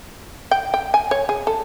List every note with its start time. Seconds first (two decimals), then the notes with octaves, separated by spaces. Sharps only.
0.51 G5
0.74 G5
0.94 G#5
1.11 C#5
1.29 G#4
1.47 A4